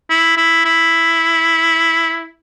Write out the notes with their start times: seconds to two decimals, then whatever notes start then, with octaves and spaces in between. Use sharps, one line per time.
0.10 E4
0.37 E4
0.65 E4